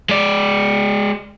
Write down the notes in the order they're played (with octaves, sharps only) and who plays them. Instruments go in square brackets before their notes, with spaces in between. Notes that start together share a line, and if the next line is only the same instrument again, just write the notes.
[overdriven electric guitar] G#3 D5